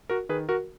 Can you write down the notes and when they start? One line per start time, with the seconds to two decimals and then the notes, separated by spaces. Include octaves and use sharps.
0.09 F#4 A#4
0.29 D#3 G#4 B4
0.49 F#4 A#4